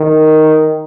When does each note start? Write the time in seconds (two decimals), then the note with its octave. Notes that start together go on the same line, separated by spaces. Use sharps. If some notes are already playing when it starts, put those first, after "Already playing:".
Already playing: D#3